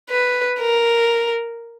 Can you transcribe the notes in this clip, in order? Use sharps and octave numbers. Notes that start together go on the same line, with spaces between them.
B4
A#4